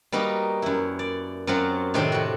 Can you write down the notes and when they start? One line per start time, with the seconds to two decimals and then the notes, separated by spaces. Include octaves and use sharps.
0.12 G3 A#3 B3 D#4 F#4
0.62 F#2 E4
0.99 D5
1.47 F#2 F#3 C4 F4 F#5
1.94 A2 C3 D#3 D4 C5 G5
2.12 F2 F#4